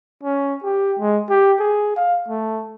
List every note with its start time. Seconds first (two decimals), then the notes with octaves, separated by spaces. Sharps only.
0.23 C#4
0.64 G4
1.00 G#3
1.30 G4
1.60 G#4
1.97 F5
2.29 A3